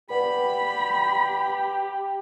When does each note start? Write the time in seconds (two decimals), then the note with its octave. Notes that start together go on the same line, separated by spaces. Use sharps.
0.10 G4 B4 D5 F#5 B5